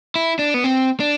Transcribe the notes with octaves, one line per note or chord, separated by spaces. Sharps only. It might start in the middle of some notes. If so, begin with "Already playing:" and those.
E4
D4
B3
C4
D4